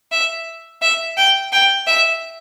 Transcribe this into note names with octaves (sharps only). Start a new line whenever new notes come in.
E5
E5
G5
G5
E5